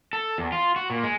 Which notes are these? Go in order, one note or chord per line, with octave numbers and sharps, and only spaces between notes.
A4
E2
F4
F#4
A#2
G#3